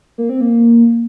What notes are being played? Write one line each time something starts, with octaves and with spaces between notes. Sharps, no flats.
A#3
C4
A#3